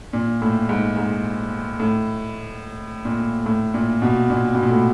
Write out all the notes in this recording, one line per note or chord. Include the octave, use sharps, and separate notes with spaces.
A#2
A2
G#2
G#2
A2
A#2
A2
A#2
B2
A#2
B2
A#2
A2